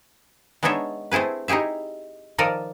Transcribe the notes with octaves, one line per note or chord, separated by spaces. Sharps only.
G#3 B3 D4 D#4 C#5 E5
A3 C4 E4 G#4 B4
D#4 E4 G4 G#4 E5
D#3 F3 A4 A#4 D5 D#5